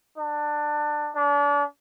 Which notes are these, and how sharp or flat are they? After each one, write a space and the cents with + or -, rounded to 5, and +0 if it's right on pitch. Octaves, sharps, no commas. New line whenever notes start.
D4 +20
D4 -35